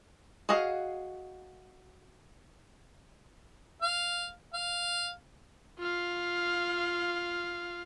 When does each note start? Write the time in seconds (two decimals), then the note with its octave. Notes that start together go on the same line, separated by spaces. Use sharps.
0.49 F#4 G#4 D#5 F5
3.82 F5
4.53 F5
5.79 F4 F5